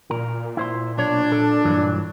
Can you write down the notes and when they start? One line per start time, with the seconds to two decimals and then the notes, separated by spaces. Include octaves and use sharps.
0.11 A#2 A#4
0.57 E4 C5 C6
0.98 B1 D4 C#5
1.32 A4
1.65 G2 E3 F#3